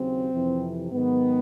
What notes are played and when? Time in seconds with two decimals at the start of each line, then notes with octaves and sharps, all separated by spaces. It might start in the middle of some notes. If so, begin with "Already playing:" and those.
Already playing: D#2 C#3 F#3 C4
0.32 F2 C3 E3
0.91 G#2 D#3 F#3 B3